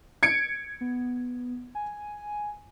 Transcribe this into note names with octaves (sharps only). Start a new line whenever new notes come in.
G#6 C#7 D7
B3
G#5